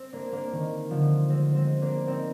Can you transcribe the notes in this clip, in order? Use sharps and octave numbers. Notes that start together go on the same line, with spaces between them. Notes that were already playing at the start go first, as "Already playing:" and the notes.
Already playing: C4
A#3 D4
A#3 D4
D#3
D3 F3
G#3 C4
G#3 C4
A#3 D4
C4 D#4